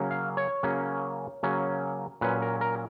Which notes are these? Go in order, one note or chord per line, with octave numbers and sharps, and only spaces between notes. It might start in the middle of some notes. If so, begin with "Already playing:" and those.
Already playing: C#3 F#3 A#3 C#4
F5
C#5
C#3 F#3 A#3 C#4
C#3 F#3 A#3 C#4
A#2 F#3 C#4 B4
A#4
A#4